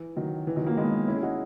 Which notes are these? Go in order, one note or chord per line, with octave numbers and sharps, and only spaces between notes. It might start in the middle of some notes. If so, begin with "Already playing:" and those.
Already playing: E3
D#3 F#3
E3
D#3 F#3
F#3 A#3
G#3 B3
C#4 E4
G#4
D#4 F#4